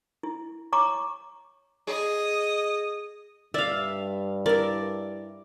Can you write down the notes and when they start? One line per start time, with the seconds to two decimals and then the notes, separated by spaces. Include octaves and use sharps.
0.23 E4
0.72 C#5 A#5 C#6 D6
1.87 G#4 D#5
3.54 G2 D5 E5 F5
4.46 E4 A#4 D5